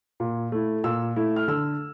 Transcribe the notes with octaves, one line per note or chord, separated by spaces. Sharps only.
A#2
A3 E4
A#2 E6
A3 E4
F6
D3 E6